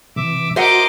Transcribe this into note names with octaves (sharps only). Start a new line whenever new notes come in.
C3 E3 E5 D6
F#4 A#4 C5 D#5 E5 F#5 C6 D6